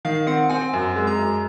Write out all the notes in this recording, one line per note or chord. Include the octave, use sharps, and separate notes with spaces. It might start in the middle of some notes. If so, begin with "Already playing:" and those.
D#3 F5
C4 F#5
C4 G#5
F#2
G#3
A#5
F#2